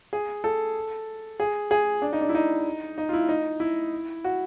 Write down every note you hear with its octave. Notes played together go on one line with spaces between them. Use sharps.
G#4
A4
G#4
G#4
D4
D#4
D4
E4
D#4
D#4
F4
E4
D#4
E4
F#4